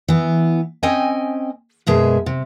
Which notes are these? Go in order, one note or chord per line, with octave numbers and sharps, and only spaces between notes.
E3 B3
C4 C#4 D#5 G5 G#5
F#2 B2 G#3 G#4 E5
C3